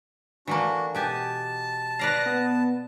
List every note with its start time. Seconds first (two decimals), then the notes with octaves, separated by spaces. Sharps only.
0.47 E3 A3 A#3 D4 F#4
0.95 B2 G4 G#5 A5
1.99 B4 D5 F5 A#6
2.26 B3